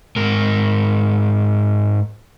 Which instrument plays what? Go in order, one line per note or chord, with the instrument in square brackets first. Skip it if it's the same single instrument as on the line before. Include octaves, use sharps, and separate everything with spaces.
[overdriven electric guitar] G#2 A#4